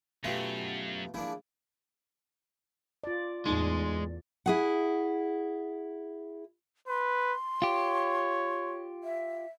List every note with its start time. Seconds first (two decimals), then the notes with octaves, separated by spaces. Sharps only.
0.24 F#2 B2 A3 F4 G4 A4
1.14 F3 A#3 D4 E4 G#4
3.04 F4 D5
3.45 E2 A2 G#3 D#4 C6
4.46 E4 G#4 F#5
6.88 B4 C6
7.62 F4 G4 C#5
9.04 E5